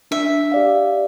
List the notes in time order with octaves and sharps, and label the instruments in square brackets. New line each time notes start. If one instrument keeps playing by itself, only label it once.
[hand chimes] D4 [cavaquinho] E5
[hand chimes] G4 D5 F5